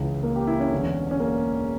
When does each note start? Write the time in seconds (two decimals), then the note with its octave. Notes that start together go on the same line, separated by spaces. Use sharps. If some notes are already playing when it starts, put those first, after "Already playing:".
Already playing: C#2 C#3 E3
0.23 A#3
0.36 G4
0.47 E4
0.60 C#4
0.72 E1 E2 D3
1.11 C#4
1.20 A#3